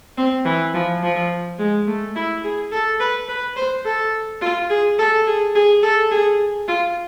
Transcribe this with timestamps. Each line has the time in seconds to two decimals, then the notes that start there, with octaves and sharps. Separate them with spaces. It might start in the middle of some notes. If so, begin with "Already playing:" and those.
0.18 C4
0.45 E3
0.74 F3
1.03 F3
1.59 G#3
1.87 A3
2.16 E4
2.44 G#4
2.72 A4
3.00 B4
3.29 B4
3.57 C5
3.85 A4
4.42 F4
4.70 G#4
4.99 A4
5.27 G#4
5.55 G#4
5.83 A4
6.11 G#4
6.68 F4